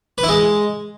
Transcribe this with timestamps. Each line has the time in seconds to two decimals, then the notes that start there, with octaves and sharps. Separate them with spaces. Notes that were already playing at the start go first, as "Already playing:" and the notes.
0.18 B4
0.23 E4
0.29 G#3